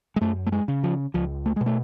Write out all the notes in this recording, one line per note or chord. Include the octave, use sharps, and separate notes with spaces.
G#3
F#2 A3
A3
G#3
C#3
F3
C#2 F3
A3
G#3
B2
A3